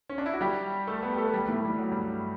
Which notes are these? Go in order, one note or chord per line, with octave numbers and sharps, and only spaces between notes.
C#4
D4
E4
F#4
G3 G4
A3 A4
B3 B4
G4
A3 A4
G3 G4
A2 A3
G3
F#3
G2 G3